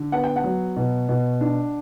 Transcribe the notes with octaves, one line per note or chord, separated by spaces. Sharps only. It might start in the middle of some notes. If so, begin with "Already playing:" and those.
Already playing: D3
B3 F#5
G5
F#5
F#3
B2
B2
D4